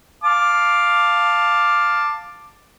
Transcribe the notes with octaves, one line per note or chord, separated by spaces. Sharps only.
F5 A5 D6